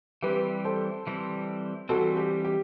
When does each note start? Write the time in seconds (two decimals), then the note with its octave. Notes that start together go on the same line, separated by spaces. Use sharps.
0.23 E3 G3 C4 G4 B4
0.64 A4 C5
1.07 E3 G3 C4
1.89 E3 G3 C4 F#4 A4
2.17 G4
2.45 G4